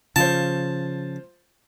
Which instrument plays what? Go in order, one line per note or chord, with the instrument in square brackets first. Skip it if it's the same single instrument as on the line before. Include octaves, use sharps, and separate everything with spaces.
[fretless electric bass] C#3 F3 [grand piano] F4 C5 [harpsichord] A5